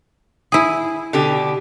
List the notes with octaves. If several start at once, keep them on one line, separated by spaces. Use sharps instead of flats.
E4 G#4
B2 D3 G4